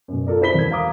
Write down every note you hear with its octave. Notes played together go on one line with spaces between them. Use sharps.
F#2 B2
F4 A4 A#4 D5
E4 C5 B5 B6 G7
E1 E3 A#4 G#6
F5 A#5 D6 D#6